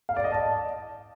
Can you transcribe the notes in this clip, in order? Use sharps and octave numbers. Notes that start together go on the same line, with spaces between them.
F5
D5
D#5
A5